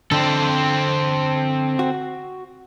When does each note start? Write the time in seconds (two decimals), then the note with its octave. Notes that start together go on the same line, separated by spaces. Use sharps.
0.12 D3 C4 A4
1.79 F#4